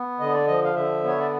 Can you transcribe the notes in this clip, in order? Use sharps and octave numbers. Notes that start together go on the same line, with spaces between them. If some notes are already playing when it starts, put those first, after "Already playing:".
Already playing: B3
D3 D#5
D5
F3 D#5
F5
D3 E5
B3 C#5
D5